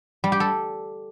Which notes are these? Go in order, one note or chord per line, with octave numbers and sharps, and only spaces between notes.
G3
G4
A4